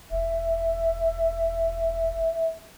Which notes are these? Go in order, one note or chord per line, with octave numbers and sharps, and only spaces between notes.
E1 E5